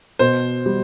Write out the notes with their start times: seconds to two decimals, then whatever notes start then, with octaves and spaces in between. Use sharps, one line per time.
0.19 B2 C5
0.66 G3